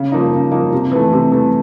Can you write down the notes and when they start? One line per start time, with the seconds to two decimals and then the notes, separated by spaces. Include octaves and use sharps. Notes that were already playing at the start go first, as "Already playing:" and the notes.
Already playing: C#3
0.12 F3 A#3 D#4
0.32 C#3
0.52 F3 A#3 D#4
0.73 C3
0.92 E3 A3
1.13 C3
1.32 E3 A3